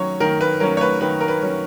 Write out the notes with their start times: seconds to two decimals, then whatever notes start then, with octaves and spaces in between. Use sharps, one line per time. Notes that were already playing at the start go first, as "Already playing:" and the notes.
Already playing: D#3 F#3 C#4 C#5
0.20 D#3 A#4
0.41 B4
0.60 F#3 C#4 A#4
0.77 C#5
0.81 B4
1.01 D#3 B4
1.21 A#4
1.28 B4
1.42 F#3 C#4